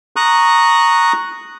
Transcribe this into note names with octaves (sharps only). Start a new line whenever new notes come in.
A#5 C#6 D#6 F#6